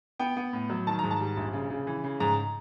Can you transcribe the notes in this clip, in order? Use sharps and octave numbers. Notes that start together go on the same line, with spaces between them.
B3 G5
B3
A2
F#3
D#3 A5
G#2 A#5
A5
G3
A#1
C#3
C#3
E3
C#3
G#2 A#5